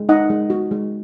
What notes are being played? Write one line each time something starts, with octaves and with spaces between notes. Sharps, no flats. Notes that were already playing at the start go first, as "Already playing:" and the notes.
Already playing: G#3
D#4 D#5 F#5
G#3
F#4
G#3